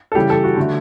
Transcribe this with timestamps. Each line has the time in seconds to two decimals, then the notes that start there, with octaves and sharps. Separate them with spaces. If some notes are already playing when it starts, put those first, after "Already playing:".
0.12 A4
0.15 C#3 E3 G3 G4
0.30 A4
0.44 F#4
0.56 D3 A3